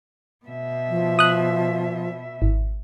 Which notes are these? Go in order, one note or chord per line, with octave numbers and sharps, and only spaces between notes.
B2 E5
F3
D#6 F#6
G#1